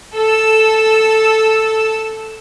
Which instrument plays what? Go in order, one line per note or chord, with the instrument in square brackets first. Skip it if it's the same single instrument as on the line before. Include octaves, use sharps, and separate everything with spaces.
[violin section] A4 E6